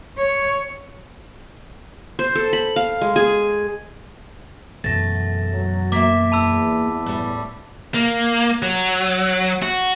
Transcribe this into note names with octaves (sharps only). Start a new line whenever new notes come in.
C#5
C5
A4
B5
F5
G#3
G#4
F#2 B2 E3 A3 A6 A#6
F#3
A#3 E5 D6 B6
E2 A5 B5 E6
A2 G3
A#3
F#3
F#4